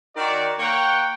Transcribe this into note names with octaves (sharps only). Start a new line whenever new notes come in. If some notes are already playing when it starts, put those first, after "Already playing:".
D#3 F#4 D5
A#3 C#5 F#5 G5